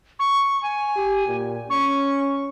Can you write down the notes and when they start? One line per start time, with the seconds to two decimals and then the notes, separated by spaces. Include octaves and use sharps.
0.19 C#6
0.63 G#5
0.96 G4
1.27 A#2
1.70 C#4 C#6